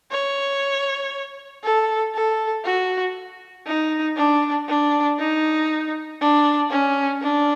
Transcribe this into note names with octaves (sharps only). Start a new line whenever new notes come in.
C#5
A4
A4
F#4
D#4
D4
D4
D#4
D4
C#4
D4